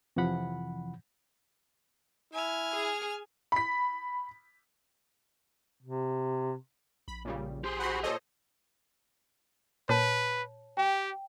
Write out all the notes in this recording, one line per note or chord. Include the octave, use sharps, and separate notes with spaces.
F2 C3 E3 F3 F#5 B5
E4 G#5 F6
G#4
B5 B6
C3
A#1 B5
A#2 C#3 G3
G4 G#4 C5 C6
F#4 C5 F#5 B5 C6
A#2 A4 C5 C#5 D#5
A#2 B4 C#5 A5
G4 G5